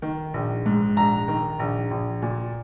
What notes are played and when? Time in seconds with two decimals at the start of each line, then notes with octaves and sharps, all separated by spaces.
0.02 D#3
0.34 A#1
0.66 G#2
0.96 A#1 A#5
1.28 D#3
1.59 A#1
1.91 A#1
2.22 A#2